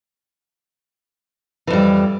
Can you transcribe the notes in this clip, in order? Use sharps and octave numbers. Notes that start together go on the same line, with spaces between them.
F2 E3 G3